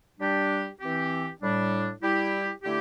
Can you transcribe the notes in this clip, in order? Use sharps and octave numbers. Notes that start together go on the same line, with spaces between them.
G3 D4 G4
E3 C4 G4
A2 G3 D4
G3 E4 G4
D3 A3 E4 G4